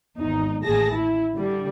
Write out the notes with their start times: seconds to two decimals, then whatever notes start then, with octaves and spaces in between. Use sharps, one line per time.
0.19 G#1 E2 D#4
0.63 A1 D#2 G#4 A5 A#6
0.94 E4
1.34 D3 G3